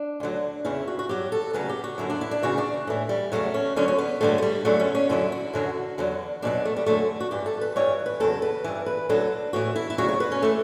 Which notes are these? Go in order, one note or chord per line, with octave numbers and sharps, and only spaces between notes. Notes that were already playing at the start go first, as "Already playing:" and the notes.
Already playing: D4
D2 D3 F#3
E2 C#3 E3 E4
F#4
F#4
G2 F#3 G4
A4
D2 C#3 F#3 B4
G4
F#4
F#2 D3 F#3 E4
D4
E4
D4
D2 C#3 E3 F#4
D4
A2 E3
G3
E2 C#3 F#3 A3
C#4
D2 D3 F#3 C#4
C#4
B3
G2 D3 F#3 A3
A3
G3
E2 D3 F#3 A3
C#4
C#4
F#2 D3 F#3 E4
F#4
F#2 D3 F#3
E2 D3 F#3
E2 B2 F#3 D4
A3
G3
E2 D3 F#3 A3
F#4
G2 E3 G4
A4
B4
G2 E3 C#5
B4
E2 C#3 F#3 A4
B4
G2 E3
B4
D2 D3 F#3 A4
A2 E3 F#4
E4
E4
D2 C#3 F#3 F#4
C#5
B4
C#4
E3 A3